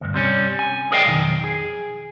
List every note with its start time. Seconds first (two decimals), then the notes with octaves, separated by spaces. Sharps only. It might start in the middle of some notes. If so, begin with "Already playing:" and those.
0.01 D2 G2
0.14 C3 G3 C#4
0.59 G#5
0.92 G#4 A#4 D5 D#5 F5 G5
1.06 B1 F2 D#3
1.44 G#4